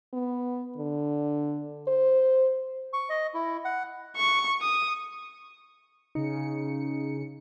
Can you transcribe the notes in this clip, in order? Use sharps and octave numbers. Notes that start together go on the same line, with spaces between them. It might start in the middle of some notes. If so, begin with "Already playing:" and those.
B3
D3
C5
C#6
D#5
E4
F#5
C#6
D#6
C#3 D#4 C#7